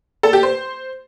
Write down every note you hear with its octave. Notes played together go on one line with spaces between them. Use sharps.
A4
G4
C5